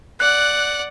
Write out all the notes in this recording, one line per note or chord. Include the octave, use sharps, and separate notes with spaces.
D5 F#5 F#6